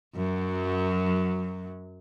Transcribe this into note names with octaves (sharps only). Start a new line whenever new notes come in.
F#2 F#3